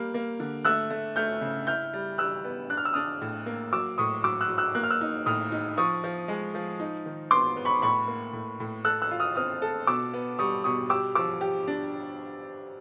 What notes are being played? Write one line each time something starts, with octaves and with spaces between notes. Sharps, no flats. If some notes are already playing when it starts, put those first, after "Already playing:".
Already playing: G3 A#3 F6
A#3
D3
A3 E6 F#6
A3
A3 F6 G6
C#3
E4 F6 G6
G3
G3 E6 F#6
B3
D4 F#6
F6
E6
D4 D#6 F6
A2
A#3
F#3 D6 E6
A2 C#6 D#6
F#3 D6 E6
E6 F#6
F#3
E6 F#6
A#3 F#6
F6
E6 F#6
D#4
A2 D#6 F6
D#4
F3 C#6 D#6
F3
G#3
F3
D#4
D#3
B3 C6 D6
B3
B5 C#6
A2 B5 C#6
A#3
A2
A2
A4 E6 F#6
E6 F#6
F4
D#6 F6
C4 D#6 F6
A4
B2 D6 E6
B3
G3 C#6 D#6
B2 C#6 D#6
G4 D6 E6
F3 D6 E6
G4
D4